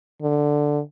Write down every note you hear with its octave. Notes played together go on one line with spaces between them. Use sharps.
D3